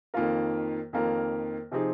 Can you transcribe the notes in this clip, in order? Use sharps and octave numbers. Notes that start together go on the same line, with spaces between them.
F2 D#3 A#3 F4 A#4
F2 D#3 A#3 F4 A#4
C3 F3 C4 D#4 G#4